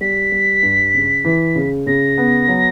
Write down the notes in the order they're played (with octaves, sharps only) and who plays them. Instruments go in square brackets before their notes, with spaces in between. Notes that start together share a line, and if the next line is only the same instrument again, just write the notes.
[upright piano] G3 [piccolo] B6
[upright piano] G3
G2
C#3
E3
C#3
[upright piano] C#3 [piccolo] A#6
[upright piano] B3
F#3